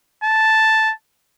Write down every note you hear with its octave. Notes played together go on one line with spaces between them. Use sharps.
A5